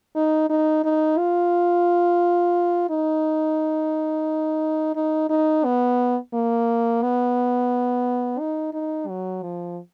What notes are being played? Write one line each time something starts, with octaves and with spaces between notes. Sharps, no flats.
D#4
D#4
D#4
F4
D#4
D#4
D#4
B3
A#3
B3
D#4
D#4
F#3
F3